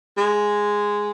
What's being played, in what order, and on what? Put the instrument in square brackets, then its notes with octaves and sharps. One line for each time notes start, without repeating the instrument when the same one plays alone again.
[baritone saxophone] G#3